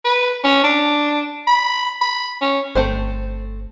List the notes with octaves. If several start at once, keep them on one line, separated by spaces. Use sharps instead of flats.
B4
C#4
D4
B5
B5
C#4
G1 A3 C4 C5